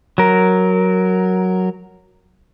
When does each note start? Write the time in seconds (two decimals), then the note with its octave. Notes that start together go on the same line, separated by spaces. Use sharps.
0.18 F#3 A#4